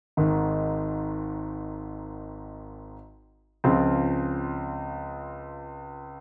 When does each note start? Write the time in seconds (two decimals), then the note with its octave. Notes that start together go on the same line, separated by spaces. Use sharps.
0.17 G#1 G#2 D#3
3.64 C#2 C#3 F3 C4 F4